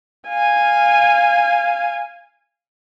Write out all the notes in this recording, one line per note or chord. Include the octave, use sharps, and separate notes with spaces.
F5 G#5